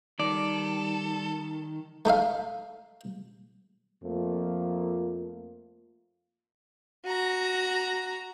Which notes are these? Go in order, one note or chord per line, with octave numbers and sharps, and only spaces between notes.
D#3 G3 A4 D5
A3 D#4 E5 F5
F2 F3 A3 A#3
F#4 A#5